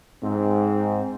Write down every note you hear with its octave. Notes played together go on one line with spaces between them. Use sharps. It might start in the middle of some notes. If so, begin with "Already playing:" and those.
G#2 C4